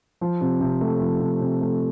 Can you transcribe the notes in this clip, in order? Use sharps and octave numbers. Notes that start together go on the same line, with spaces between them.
F3
C3
C3
A3
F3
C3
C3
A3